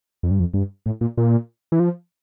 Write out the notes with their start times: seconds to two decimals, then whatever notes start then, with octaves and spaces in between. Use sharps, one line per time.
0.23 F2
0.31 G2
0.40 F2
0.54 G2
0.86 A2
1.01 A#2
1.17 A#2
1.72 E3
1.80 F3